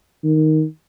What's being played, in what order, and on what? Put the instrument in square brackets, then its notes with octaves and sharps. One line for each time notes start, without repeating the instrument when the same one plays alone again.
[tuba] D#3